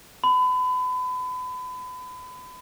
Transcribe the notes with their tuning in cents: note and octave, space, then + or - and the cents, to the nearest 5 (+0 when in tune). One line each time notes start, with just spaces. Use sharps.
B5 +35